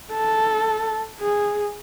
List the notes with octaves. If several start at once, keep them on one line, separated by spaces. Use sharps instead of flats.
A4
G#4